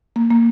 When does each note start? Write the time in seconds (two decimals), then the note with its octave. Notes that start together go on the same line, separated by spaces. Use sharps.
0.16 A#3
0.30 A#3